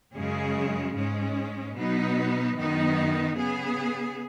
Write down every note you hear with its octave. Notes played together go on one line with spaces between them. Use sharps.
F#2 C#3 G#3 C#4 G#4
G#2 G#3 C#4
B2 F#3 B3 D#4 B4
F#2 D#3 B3 D#4
C#3 B3 G#4